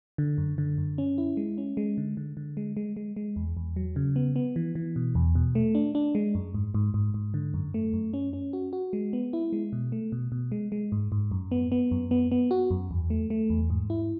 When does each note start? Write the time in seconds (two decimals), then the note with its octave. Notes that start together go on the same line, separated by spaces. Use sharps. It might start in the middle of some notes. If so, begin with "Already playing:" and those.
0.18 D3
0.38 F#2
0.58 D3
0.78 F#2
0.98 C#4
1.18 E4
1.37 G#3
1.58 C#4
1.77 G#3
1.97 D3
2.17 D3
2.37 D3
2.57 G#3
2.77 G#3
2.96 G#3
3.16 G#3
3.36 E2
3.57 E2
3.76 F#3
3.96 C#3
4.16 B3
4.36 B3
4.56 E3
4.75 E3
4.96 B2
5.15 E2
5.35 B2
5.55 A3
5.75 D4
5.95 D4
6.15 G#3
6.35 F#2
6.54 G#2
6.74 G#2
6.94 G#2
7.14 G#2
7.34 D3
7.54 F#2
7.74 A3
7.93 F#2
8.14 C#4
8.33 C#4
8.53 F#4
8.73 F#4
8.93 G#3
9.13 B3
9.33 E4
9.53 G#3
9.73 B2
9.92 A3
10.12 B2
10.32 B2
10.52 G#3
10.72 G#3
10.92 G#2
11.12 G#2
11.31 F#2
11.52 B3
11.72 B3
11.91 F#2
12.11 B3
12.32 B3
12.51 F#4
12.71 F#2
12.91 E2
13.10 A3
13.30 A3
13.50 E2
13.70 G#2
13.90 E4